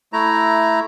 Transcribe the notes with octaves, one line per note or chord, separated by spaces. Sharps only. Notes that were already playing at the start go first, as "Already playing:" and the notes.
A3 E4 A#5